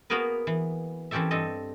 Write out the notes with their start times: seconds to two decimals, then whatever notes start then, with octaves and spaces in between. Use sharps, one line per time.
0.10 A#3 B3 F#4 G#4 A#4 B4
0.47 E3
1.11 E3 C4 C#4 G4 A4 E5
1.31 G2 C4 A4 D#5